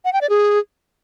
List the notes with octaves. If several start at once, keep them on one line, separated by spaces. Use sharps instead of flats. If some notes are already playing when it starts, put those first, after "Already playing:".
F#5
G5
D5
G#4